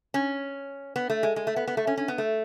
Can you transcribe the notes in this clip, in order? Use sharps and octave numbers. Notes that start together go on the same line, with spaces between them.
C#4
B3
A3
G#3
G#3
A3
B3
B3
A3
C#4
C#4
B3
A3